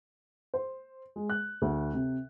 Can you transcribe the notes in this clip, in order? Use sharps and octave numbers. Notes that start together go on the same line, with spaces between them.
C5
G#3
F#6
D2
C3